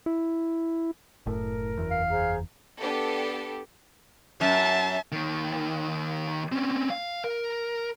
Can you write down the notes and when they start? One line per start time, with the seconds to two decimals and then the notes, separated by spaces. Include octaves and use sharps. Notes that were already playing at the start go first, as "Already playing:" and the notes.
0.06 E4
1.26 F#1 A2 A#4
1.77 F#1 E2
1.91 F5
2.11 G#4 C5 A#5
2.79 B3 D4 G4 A4
4.41 F#2 E5 A5
5.12 D#2 D#3
6.52 C4 C#4
6.90 F5
7.24 A#4